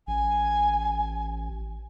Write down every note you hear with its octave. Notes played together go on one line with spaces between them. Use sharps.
A1 G#5